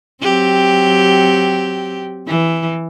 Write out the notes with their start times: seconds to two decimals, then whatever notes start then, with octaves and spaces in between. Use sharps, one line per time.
0.22 F#3 C4 G4
2.27 E3